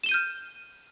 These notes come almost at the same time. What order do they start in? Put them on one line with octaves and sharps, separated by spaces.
E7 G7 D#7 G6 F6